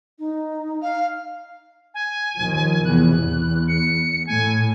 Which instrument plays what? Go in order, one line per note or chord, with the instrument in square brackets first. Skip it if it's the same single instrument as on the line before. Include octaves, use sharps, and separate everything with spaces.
[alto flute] D#4
[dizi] F5
[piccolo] G#5
[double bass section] D#2 D#3 F3
[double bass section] E2 C3 [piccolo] F#6
[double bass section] E2
[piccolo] C#7
[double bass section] A2 A3 [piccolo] G#5